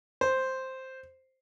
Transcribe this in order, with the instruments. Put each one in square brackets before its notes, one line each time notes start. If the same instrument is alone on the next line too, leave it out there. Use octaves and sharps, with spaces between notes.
[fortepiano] C5